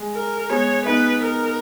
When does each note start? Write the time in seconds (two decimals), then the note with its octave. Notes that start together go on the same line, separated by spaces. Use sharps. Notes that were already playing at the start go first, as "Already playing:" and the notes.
Already playing: G#3
0.13 A#4
0.49 G#3 B3 C#5
0.86 B3 D#4 B4
1.23 A#4